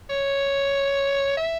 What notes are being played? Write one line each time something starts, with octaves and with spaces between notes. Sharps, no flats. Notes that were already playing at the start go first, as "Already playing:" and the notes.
C#5
E5